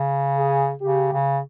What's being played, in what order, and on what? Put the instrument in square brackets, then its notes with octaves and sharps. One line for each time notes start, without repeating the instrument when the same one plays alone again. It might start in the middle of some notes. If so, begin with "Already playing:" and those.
Already playing: [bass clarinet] C#3
[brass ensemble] G#4
[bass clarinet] C#3 [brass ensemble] G4
[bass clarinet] C#3